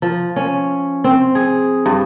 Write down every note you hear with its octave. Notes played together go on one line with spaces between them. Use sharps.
F3
C#4
C4
G#4
G2